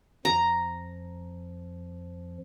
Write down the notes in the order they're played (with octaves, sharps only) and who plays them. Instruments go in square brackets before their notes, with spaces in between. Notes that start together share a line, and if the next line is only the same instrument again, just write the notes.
[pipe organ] F2 F3 [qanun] A#5